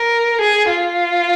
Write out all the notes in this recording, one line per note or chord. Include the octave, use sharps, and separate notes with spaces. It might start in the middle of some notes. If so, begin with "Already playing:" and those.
Already playing: A#4
G#4
F4